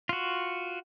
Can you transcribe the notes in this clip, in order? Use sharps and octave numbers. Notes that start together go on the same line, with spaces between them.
F4 F#4